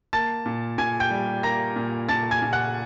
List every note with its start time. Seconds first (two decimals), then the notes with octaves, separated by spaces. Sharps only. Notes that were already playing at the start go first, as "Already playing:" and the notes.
0.13 A#3 A5 A6
0.46 A#2
0.78 A#2 G#5 G#6
1.00 G5 G6
1.11 G3
1.43 A#3 A#5 A#6
1.76 A#2
2.09 A#2 A5 A6
2.31 G#5 G#6
2.42 A#2
2.53 F#5 F#6